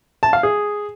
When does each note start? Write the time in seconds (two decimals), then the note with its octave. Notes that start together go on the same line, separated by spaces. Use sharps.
0.23 A5
0.33 F5
0.43 G#4